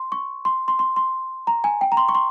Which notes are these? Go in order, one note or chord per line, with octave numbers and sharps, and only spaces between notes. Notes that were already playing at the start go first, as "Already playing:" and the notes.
Already playing: C6
C#6
C6
C6
C6
C6
A#5
G#5
G5
A#5
C6
C#6
C6